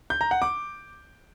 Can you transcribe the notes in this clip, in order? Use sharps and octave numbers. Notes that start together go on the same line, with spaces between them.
G6
A#5
F#5
D6